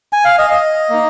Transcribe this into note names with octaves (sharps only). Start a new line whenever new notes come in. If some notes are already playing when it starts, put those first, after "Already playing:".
G#5
F5
D#5
D#5
A#3 D#4